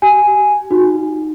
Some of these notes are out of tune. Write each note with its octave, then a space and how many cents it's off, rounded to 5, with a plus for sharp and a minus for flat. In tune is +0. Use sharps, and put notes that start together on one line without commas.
G4 -30 G#5 +0
D#4 +0 F#4 -30